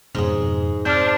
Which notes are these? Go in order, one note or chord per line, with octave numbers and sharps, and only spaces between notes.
F2 G#2 B2 G#4
C4 D4 F6 G6